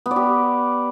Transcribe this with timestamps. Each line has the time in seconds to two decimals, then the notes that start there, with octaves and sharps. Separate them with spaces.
0.06 B3
0.11 D5
0.16 G4